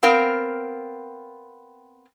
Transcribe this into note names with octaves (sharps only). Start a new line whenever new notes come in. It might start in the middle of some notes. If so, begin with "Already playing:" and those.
B3 C4 A#4 F5 G5